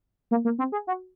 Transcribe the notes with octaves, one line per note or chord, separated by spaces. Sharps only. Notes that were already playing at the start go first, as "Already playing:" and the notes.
A#3
A#3
C4
G#4
F#4